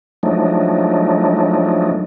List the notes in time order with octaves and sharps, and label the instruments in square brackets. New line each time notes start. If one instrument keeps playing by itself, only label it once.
[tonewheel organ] F3 F#3 G#3 A3 D4 D#4